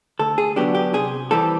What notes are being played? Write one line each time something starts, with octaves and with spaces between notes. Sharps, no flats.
D2 A4
G#4
D3 F#3 B3 D4 G4
G4
C3 G#4
E3 G3 C4 A4